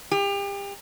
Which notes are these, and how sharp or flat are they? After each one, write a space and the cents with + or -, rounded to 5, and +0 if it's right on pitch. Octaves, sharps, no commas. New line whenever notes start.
G4 +35